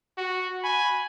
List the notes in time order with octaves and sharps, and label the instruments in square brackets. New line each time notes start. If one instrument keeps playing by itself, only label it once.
[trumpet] F#4
[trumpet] G#5 [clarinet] B5